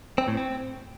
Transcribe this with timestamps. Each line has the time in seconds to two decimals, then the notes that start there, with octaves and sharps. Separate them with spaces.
0.18 C4
0.28 A2
0.37 C4